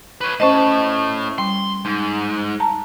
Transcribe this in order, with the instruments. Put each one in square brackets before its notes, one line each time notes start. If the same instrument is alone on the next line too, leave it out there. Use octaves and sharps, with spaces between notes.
[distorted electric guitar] B4 C#5
[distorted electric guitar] A2 A5 [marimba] C#4 C5 D#5
[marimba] G3 [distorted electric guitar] C6
[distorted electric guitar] G#2
[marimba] A5 A#5